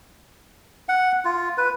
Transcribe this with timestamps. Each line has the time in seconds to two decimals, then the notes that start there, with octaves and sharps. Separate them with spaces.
0.89 F#5
1.25 F4
1.58 B4